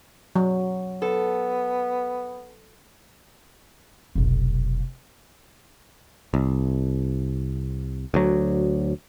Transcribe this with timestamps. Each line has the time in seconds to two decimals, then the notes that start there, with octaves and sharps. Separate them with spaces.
0.36 F#3
1.02 B3 A4
4.15 F1 B1
6.34 C2
8.14 D2 F#3